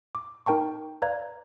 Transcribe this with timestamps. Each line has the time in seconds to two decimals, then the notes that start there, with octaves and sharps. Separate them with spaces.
0.15 D6
0.46 D#4 A#4 G5 A5 C#6
1.02 B4 D5 F5 A#5 G#6